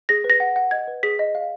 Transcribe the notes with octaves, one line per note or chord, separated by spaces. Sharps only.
G#4 A#6
B4
A#6
F#5
F#5
D#5 G#6
B4
G#4 B6
D#5
F5